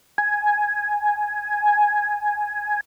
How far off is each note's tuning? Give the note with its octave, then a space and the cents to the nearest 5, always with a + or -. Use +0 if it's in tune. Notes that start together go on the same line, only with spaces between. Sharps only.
G#5 +5